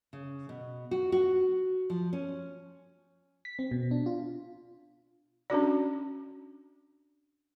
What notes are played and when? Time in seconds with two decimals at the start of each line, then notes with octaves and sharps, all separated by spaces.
0.13 C#3
0.49 B2
0.91 F#4
1.12 F#4
1.90 F3
2.13 C#4
3.45 B6
3.59 C4
3.71 B2
3.91 D4
4.06 F4
5.50 C#4 D4 F#4 D5